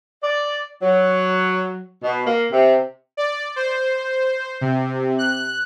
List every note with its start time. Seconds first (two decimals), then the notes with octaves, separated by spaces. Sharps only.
0.23 D5
0.82 F#3
2.04 B2
2.27 A#3
2.51 C3
3.17 D5
3.56 C5
4.61 C3
5.18 F#6